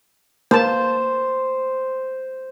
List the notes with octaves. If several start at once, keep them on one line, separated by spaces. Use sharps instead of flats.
A#3 C5 A5